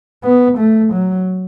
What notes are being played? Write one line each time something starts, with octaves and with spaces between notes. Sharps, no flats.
B3
A3
F#3